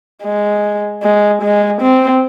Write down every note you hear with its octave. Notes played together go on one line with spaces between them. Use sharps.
G#3
G#3
G#3
C4